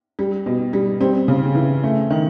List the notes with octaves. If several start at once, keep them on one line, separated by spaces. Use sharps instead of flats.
G3
B2
G3
G3 C4
C#3
E3
A3
D#3